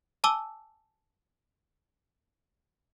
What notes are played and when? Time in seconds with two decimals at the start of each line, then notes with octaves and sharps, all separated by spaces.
0.24 G#5 A5 D6 E6 G7